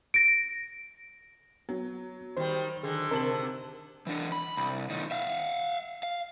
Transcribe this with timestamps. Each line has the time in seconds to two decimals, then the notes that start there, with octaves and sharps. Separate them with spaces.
0.14 A#6 D7
1.69 F#3 B3
2.37 D#3 G3 C5
2.83 D3 D#3 G#4
3.11 C3 A#4 C5 A5 F#7
4.07 E3 D4
4.32 B5
4.57 C2
4.90 B1 D#3
5.11 E5 F5
6.03 F5